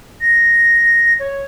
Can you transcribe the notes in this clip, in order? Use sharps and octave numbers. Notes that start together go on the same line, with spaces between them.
A#6
C#5